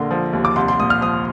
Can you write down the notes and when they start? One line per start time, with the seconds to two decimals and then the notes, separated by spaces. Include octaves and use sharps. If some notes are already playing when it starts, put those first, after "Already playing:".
Already playing: A#1 D3 A#3 C6
0.11 F3
0.33 D#2
0.45 D6
0.56 C2 C6
0.68 C6
0.80 A#2 D#6
0.90 F6
1.01 F3 D#6